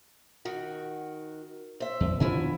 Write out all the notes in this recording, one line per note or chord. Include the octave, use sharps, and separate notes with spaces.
D#3 F#4
C5 E5
E2
B2 D3 D#3 F3 E4 G#5